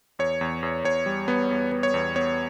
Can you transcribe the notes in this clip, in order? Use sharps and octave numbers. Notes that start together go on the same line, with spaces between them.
E2 C#5
E2
E2
E2 C#5
G3
B3
E2
B3
C#5
E2
B3 C#5